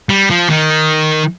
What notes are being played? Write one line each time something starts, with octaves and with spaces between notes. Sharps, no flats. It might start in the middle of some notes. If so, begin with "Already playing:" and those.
G3
F3
D#3